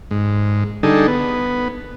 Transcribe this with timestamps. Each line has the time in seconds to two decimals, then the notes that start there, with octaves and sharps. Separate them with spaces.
0.11 G#2
0.83 D3 G3 D#4 G#4 A4
1.07 B3